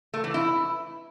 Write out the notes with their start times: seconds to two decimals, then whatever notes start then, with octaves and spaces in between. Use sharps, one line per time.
0.14 A3
0.24 E3
0.34 E4